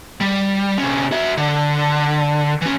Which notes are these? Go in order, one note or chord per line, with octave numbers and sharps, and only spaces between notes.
G3
C3 C#4
F#4 E5
D3
E3 C#4